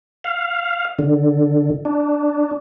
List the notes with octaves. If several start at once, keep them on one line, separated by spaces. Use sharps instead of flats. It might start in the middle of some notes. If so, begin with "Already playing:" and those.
F5
D3
D4